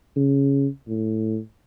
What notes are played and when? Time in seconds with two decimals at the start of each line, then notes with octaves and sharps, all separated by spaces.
0.16 C#3
0.88 A2